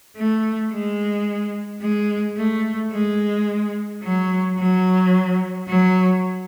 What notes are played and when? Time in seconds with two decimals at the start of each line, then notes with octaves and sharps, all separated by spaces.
0.17 A3
0.71 G#3
1.81 G#3
2.37 A3
2.92 G#3
4.03 F#3
4.59 F#3
5.68 F#3